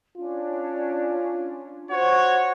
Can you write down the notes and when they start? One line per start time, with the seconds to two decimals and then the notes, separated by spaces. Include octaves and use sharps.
0.17 C#4 D4 F4
1.91 F#4 C5 C#5